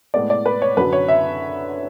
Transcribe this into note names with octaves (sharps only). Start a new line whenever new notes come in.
A2 G#3 B3 D5
D5
B4
C#5
F#2 D3 F#3 B4
C#5
E5